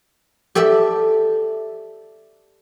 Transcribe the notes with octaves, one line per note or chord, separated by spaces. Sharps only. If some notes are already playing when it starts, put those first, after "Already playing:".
G4 A4 D5 E5